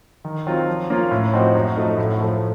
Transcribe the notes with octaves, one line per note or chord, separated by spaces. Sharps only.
D#3
F#3 C4 F4
F3
A#3 C#4 F4
A2
F3 C4 D#4 F#4
F#2
F3 A3 D#4 F#4
A2
F3 A3